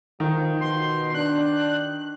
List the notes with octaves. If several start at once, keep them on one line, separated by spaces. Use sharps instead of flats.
D#3 F3
B2 C6
D4 F#6